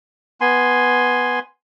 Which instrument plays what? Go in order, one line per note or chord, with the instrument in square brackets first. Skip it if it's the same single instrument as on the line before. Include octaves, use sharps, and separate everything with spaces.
[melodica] B3 G#5 C6